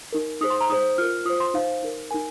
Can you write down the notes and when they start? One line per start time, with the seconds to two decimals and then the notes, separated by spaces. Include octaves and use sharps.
0.12 D#4 A#4
0.41 D#4 G#4 C5 D#6
0.50 C6
0.61 A#5
0.69 D#4 G#4 C5 D#6
0.98 F4 A#4 F6
1.25 F4 D#6
1.30 C5
1.40 C6
1.54 D#4 C5 F5
1.82 D#4 A#4
2.11 D#4 A#4 G#5